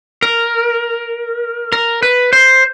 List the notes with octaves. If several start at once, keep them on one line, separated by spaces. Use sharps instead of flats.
A#4
A#4
B4
C5